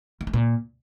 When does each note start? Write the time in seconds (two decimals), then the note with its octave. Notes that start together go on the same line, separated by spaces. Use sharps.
0.21 D#3
0.27 G#3
0.34 A#2